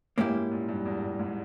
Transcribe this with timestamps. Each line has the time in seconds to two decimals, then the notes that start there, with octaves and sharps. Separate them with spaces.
0.18 G#2 A#3 C#4 E4 G4
0.35 G#2
0.52 A#2
0.69 G2
0.85 E2
1.02 G2
1.19 G#2